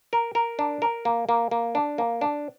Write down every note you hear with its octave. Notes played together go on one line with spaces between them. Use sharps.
A#4
A#4
D4
A#4
A#3
A#3
A#3
D4
A#3
D4